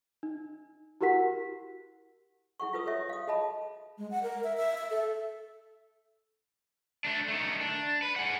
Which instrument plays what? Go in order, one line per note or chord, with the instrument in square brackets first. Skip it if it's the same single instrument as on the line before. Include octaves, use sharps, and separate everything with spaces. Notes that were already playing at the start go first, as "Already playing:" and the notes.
[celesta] D#4
E4 F#4 G4 A#4 F#5 B6
[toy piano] E4 G#4 F#5 C#6
F4 A4 B4 D#6 E6
G4 A4 C#5 E5
F5 D#6
G#4 D#5 A5 B5
[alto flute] G#3
F#5
A#4
E5
E5
E5
A4
[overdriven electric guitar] A3 D4
D#3 A3
D4
B4
G#4 F#5